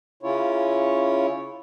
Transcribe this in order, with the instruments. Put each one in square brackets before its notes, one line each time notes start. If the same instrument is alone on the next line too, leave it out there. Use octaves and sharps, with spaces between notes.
[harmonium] C#3 C#4 E4 F4 C#5